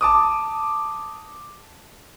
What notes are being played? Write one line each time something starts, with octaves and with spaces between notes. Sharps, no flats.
A5 D6 D#6